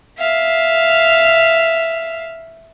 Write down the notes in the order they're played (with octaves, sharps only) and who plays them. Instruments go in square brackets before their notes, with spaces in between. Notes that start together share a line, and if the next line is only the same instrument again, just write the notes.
[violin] E5 F5